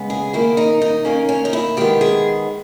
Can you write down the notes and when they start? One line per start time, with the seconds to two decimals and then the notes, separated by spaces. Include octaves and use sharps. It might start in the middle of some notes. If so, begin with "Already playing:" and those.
Already playing: C#3 G#3 B3
0.10 G#4
0.33 D#3 A#3 E4
0.57 D#4
0.82 D#4
1.05 D#3 A#3 C#4
1.29 C#4
1.45 D#4
1.53 E4
1.77 D#3 G#3 B3 G4
2.01 G#4